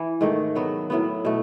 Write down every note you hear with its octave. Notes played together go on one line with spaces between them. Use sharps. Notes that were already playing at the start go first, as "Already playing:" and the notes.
Already playing: E3 E4
G#2 D#3 A3
F#3 B3 F#4
A2 F#3 B3
B2 A3